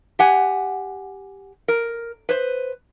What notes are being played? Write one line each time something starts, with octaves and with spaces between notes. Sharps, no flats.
G4 F#5 G#5
A#4
B4 C5